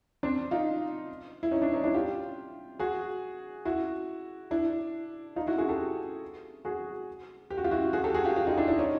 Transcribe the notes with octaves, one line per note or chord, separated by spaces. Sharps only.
C4 D4
D#4 F4
E4
C#4 D#4
D4 E4
C#4 D#4
D4 E4
F4 G4
F#4 G#4
E4 F#4
D4 E4
D#4 F4
E4 F#4
F#4 G#4
G4 A4
F#4 G#4
G4
F#4
F4 G4
E4 F#4
F#4 G#4
G4 A4
F#4 G#4
F4 G4
F4 G4
D#4 F4
D4 E4
D4 E4
C#4 D#4